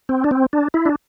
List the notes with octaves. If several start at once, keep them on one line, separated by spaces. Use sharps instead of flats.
C4
D4
C4
D4
E4
D4